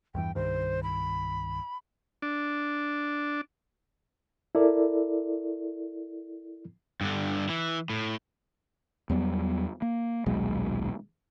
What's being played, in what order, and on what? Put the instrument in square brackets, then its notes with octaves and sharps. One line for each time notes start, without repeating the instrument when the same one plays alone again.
[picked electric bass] E2 G2 E3 [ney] G5
[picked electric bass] C2 G2 D#3 [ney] C5
[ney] B5
[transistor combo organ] D4
[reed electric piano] E4 A4 A#4 D5
[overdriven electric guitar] G2 D3
E3 E4
A2
[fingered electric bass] E2 F#3 G3 B3
A#3
D#1 B1 F#3 G#3